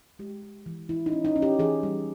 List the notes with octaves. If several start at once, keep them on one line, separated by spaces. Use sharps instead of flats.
G#3 G4
G#3
E3
E3 E4
D#4
C#4
D#4
C#4
G4
E3 G#4
G3